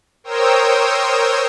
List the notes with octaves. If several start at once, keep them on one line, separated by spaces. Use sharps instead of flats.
A#4 C5 C#5 G5 D#6 E6